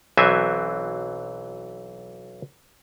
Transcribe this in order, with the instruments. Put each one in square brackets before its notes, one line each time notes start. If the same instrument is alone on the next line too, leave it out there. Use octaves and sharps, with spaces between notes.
[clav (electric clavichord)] B1 E3 F#3 C4 E5 G#5